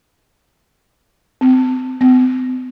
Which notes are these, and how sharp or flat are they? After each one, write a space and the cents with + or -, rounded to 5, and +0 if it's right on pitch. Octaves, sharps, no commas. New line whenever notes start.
C4 -30
C4 -45